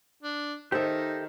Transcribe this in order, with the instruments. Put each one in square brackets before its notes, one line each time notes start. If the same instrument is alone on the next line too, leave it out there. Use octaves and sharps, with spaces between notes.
[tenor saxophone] D4
[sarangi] D#3 [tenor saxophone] D#4 [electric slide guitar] G4 A4 [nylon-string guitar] C5 E5